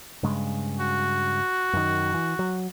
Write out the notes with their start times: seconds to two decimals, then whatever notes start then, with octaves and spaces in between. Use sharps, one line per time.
0.23 G2 C#3 G#3
0.80 F#4
1.73 F#2 D#3
2.14 E3
2.39 F#3